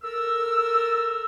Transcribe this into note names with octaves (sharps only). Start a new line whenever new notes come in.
A4 A#4 E6